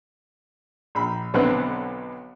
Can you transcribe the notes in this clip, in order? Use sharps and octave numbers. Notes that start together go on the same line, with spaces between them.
A#1 B5
B1 D3 B3 C4 F#6